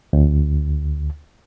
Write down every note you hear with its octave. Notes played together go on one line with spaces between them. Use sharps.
D2